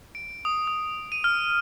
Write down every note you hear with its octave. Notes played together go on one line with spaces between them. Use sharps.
D7
D#6
D#6
D#7
F6